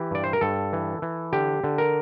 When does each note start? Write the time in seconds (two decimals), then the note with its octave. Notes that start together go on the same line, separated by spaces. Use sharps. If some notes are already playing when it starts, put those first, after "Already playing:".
Already playing: E3 G4
0.11 G2 D5
0.24 C5
0.33 A#4
0.41 G2 A4
0.73 E3
1.02 E3
1.33 D3 G4
1.64 D3
1.78 A#4